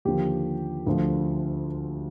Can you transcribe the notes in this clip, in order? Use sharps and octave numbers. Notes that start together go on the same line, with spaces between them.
D#2 D3 F3 G4
D2 D3 F3